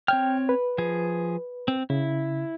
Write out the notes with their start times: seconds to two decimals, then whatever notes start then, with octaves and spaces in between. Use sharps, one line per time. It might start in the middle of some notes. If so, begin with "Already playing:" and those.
0.08 C4 C#5 G5 F6
0.49 B4
0.78 F3 G#4
1.68 C4
1.90 C#3 E4